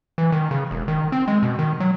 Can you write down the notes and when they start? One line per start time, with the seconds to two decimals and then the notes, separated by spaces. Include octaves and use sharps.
0.18 E3
0.32 D#3
0.51 C#3
0.71 E1
0.88 D#3
1.12 C4
1.28 G#3
1.43 B2
1.59 D#3
1.80 F#3